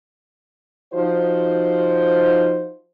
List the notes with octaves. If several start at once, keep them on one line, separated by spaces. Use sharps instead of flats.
F3 D#4 F#4 C5